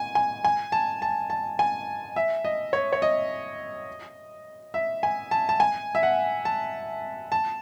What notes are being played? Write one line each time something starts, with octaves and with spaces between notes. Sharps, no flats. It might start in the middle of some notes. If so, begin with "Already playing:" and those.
Already playing: G#5
G#5
G#5
A5
A5
A5
G#5
E5
D#5
C#5
C#5
D#5
E5
G#5
A5
A5
G#5
E5
F#5
A5
A5